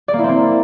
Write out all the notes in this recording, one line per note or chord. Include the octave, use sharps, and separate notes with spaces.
D5
A#3
E4
C4
A#3